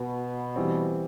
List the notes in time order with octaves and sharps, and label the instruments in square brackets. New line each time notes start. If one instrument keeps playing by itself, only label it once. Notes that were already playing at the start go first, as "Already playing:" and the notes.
Already playing: [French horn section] B2
[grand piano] E3 G3 C4